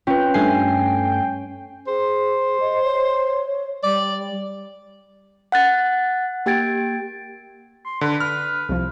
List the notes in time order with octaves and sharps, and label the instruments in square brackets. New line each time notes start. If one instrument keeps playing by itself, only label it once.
[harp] C#4 [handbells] F4 B4 [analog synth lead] G5
[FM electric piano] G2 A3 C7 [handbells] G#5
[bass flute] G#4 [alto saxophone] C5
[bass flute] D#5
C#5
[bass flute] G3 [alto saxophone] D5
[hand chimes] F#5 F#6 A6
A#3 G4 G5 G#6 A6 D7
[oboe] C6
[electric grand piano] D3 [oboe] B4
[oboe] B4 [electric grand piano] F6
[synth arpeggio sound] C2 F3